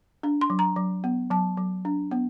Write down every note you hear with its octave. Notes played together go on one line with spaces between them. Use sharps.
D4
C6
F#3
A#5
F#3
B3
F#3 A5
F#3
D4
B3